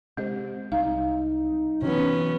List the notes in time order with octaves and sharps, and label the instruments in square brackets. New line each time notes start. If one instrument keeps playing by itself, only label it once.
[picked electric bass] C3 [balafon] G#3 D#5
[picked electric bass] C2 [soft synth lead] D#4 [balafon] F5
[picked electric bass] C3 E3 F#3 [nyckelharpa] B3 C#4